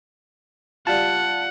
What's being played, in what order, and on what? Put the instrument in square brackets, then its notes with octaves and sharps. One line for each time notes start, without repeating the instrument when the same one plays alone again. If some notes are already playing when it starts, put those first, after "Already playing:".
[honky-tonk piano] G3 F4 [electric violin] F#5 [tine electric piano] A5